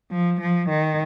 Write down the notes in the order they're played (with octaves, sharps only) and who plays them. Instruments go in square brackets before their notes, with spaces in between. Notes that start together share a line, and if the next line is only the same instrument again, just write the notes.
[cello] F3
F3
D#3